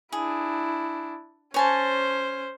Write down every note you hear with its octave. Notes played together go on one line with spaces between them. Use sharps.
D4 E4 G#4
C#4 C5 C#5 G#5 A5